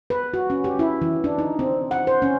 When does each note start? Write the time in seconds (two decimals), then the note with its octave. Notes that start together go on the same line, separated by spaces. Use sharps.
0.10 B4
0.34 F#4
0.50 C#4
0.64 G4
0.79 E4
1.02 E3
1.24 D4
1.39 D#4
1.59 C4
1.91 F#5
2.07 C5
2.22 C#4